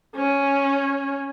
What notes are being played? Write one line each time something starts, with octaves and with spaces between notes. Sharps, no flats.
C#4